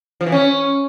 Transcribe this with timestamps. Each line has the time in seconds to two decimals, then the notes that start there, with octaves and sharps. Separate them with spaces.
0.21 F3
0.26 E3
0.32 C#4